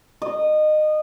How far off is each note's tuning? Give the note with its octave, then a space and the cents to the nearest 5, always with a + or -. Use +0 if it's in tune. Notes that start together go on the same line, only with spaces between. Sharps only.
D#5 -25